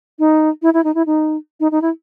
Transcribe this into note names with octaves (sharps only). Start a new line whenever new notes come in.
D#4
E4
E4
D#4
E4
D#4
D#4
D#4
E4